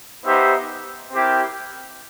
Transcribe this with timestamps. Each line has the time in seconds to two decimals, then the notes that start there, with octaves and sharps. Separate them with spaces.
0.24 B3 D#4 G4 C5 E5
1.11 C4 E4 G4 A#4